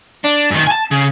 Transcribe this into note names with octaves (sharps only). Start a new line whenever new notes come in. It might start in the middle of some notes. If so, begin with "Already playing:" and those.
D4
F#2 D#3
G#5 A5
C#3